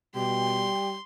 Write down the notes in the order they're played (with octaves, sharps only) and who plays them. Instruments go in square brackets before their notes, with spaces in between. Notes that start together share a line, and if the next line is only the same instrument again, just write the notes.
[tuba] B2 [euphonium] G3 [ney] G5 [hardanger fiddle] C6